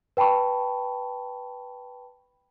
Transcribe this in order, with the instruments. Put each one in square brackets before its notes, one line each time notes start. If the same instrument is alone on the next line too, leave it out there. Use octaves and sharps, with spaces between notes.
[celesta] B4 G5 A5 B5 C#6